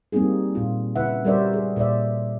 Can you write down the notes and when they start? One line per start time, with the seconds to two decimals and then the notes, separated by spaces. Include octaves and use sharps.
0.12 G3 A#3 C4 D#4 G#4
0.55 A#2 F4
0.96 C#3 E4 B4 E5 F#5
1.24 G3 F#4 A#4 C5 D5 E5
1.54 G#4
1.76 A#2 C5 D5 E5